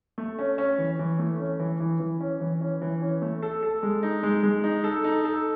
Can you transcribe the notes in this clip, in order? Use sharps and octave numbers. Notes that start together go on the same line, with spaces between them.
A3
C#4
C#4
E3
E3
A3
C#4
E3
E3
E3
C#4
E3
C#4
E3
C#4
A3
A4
A4
G#3
D#4
G#3
G#3
D#4
A4
D#4
A4